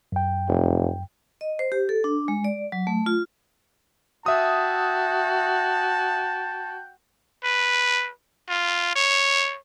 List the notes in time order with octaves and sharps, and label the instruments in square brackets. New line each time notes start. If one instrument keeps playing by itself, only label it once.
[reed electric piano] F#2 G5
[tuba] F1
[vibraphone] D#5
C5
G4
A4
D4
G#3
D5
F#3
A3
F4
[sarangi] F#4 [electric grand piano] E5 D#6 [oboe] G5 [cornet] A5
[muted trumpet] B4
F4
C#5